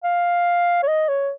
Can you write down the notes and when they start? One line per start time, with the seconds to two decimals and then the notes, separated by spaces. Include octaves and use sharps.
0.04 F5
0.83 C#5
0.88 D#5
1.09 C#5